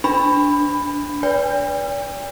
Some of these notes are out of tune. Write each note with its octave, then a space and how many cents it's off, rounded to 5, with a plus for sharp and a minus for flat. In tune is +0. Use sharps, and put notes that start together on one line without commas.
D4 -10 B5 +10
B4 +0 D5 -40 G5 +45